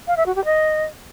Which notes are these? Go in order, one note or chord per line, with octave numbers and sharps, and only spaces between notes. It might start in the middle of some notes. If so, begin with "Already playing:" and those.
F5
E5
F#4
G4
D#5